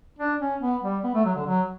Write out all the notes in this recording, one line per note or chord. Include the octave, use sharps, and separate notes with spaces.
D4
C#4
B3
G3
B3
A3
F#3
D3
F#3